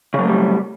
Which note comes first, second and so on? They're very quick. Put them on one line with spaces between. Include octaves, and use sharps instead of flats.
C#3 F#3 A3 G3